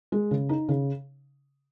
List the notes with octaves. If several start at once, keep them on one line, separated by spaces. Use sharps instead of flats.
G#3
C#3
D#4
C#3